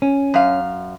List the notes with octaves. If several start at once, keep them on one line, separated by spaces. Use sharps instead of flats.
C#4
F#2 F5